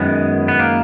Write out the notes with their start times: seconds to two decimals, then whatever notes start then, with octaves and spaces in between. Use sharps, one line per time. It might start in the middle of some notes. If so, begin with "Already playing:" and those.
Already playing: F#2 D#3 G#3 B3
0.48 B3
0.59 A#3